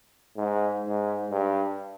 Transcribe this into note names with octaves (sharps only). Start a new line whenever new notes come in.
G#2
G#2
G2